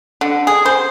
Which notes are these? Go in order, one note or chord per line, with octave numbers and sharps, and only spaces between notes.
D3
G#4
C5